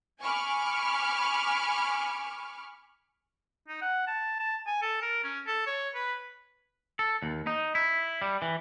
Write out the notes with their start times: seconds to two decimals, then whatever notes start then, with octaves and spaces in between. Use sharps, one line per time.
0.21 G#5 B5 C#6 D6 F6
3.68 D#4
3.82 F#5
4.08 A5
4.40 A5
4.67 G#5
4.82 A4
5.02 A#4
5.24 C#4
5.47 A4
5.67 C#5
5.95 B4
6.99 A4
7.22 D#2
7.47 D#4
7.75 E4
8.22 G3
8.42 E3